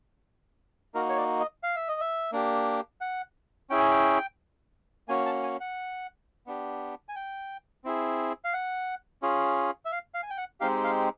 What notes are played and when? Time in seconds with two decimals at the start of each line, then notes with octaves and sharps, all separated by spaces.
0.94 A#3 D#4 F#4 A#4
1.09 C#5
1.17 D5
1.40 D#5
1.63 F5
1.76 E5
1.88 D#5
2.01 E5
2.32 A#3 D4 G4
3.01 F#5
3.70 C#4 E4 G#4 G5
3.80 G#5
3.91 G5
5.08 A#3 C#4 F#4 G#5
5.26 A5
5.43 G#5
5.60 F#5
6.47 B3 D4 G4
7.09 G#5
7.16 G5
7.84 C4 E4 G#4
8.45 F5
8.53 F#5
9.22 C#4 F4 G#4
9.85 E5
9.92 F5
10.14 F5
10.23 G#5
10.30 G5
10.38 F#5
10.61 G#3 C4 D#4 G4 F5
10.84 F5